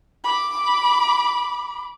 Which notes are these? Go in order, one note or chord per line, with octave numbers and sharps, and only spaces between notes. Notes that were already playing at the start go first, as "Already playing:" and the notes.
B5 D6